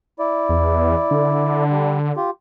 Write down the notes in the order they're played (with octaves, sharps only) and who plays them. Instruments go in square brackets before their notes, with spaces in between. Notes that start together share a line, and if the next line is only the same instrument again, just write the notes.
[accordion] E4 D5
[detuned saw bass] E2
D3
[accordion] G3
F4 G4